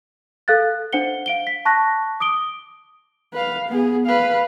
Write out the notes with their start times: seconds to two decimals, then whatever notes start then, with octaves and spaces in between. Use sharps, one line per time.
0.48 A4 F5 F#6 A6
0.93 D4 C5 F#5 C#7 G7
1.26 F5 D7 G7
1.47 B6
1.65 A5 C#6 F#6 A#6
2.20 D6 D#6 D7 G7
3.33 B4 F5
3.68 B3 G#4
4.07 B4 F5